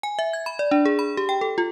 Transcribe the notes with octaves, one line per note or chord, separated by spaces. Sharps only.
G#5
E5
G#6
B5
D5
D4
G#4
B5
G4
G5
A4
F4